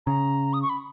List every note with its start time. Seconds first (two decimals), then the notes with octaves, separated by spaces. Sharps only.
0.06 C#3 A#5
0.53 D#6
0.62 C#6
0.69 B5